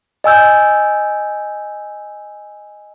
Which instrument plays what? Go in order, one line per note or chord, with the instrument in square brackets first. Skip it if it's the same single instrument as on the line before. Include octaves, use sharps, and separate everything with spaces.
[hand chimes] D#5 G#5 E6 G6